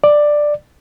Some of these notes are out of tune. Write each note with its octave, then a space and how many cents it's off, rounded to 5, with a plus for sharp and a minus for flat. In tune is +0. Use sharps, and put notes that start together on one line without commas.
D5 +10